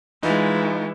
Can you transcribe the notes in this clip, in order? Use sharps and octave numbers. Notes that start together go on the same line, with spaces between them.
E3 G#3 D#4 F4